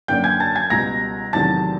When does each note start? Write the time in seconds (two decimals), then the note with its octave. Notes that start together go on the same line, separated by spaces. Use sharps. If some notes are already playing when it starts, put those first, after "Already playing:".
0.08 F#2 D3 F#3 A#3 D4 G5 G6
0.24 G#5 G#6
0.40 A5 A6
0.56 G#5 G#6
0.70 C#2 B2 G3 A#5 A#6
1.33 E2 C3 D#3 F#3 A3 A5 A6